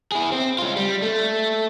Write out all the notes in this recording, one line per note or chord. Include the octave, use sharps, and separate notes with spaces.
E4 G#4
C4
G#3 F4
G3
A3